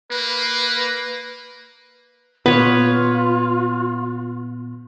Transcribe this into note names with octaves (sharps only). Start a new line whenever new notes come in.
A#3 B4
A#2 B3 F4 B4 C#5